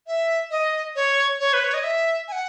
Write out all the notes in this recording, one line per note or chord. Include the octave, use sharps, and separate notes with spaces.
E5
D#5
C#5
C#5
B4
C#5
D#5
E5
G#5
F#5